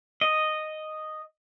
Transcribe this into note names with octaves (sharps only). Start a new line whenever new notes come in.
D#5